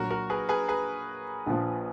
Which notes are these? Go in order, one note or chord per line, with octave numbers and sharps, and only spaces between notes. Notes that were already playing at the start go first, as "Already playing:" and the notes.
Already playing: A#1 A#2 F#3 A#3 F#4 A#4
F#4 A#4
G#4 B4
G#4 B4
G#4 B4
A#1 A#2 F3